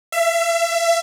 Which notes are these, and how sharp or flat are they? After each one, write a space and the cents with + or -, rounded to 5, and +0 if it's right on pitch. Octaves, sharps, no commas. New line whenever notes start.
E5 +30